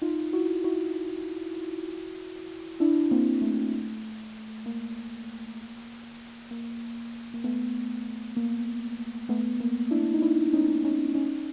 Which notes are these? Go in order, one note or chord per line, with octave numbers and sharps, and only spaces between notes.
D#4 F4
E4 F#4
E4 F#4
D4 E4
A#3 C4
A3
A#3
A#3
A#3
A3 B3
A#3
A3 B3
A#3
D4 E4
D#4
D4 E4
C#4 D#4
C#4 D#4
C#4 D#4